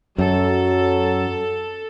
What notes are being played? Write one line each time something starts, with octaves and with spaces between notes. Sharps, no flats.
F#2 F#3 A4